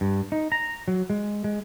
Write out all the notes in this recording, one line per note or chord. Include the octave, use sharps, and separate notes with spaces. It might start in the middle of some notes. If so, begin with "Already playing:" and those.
G2
D#4
A#5
F#3
G#3
G#3